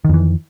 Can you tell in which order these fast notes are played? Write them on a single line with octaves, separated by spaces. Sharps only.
D#3 F2 E3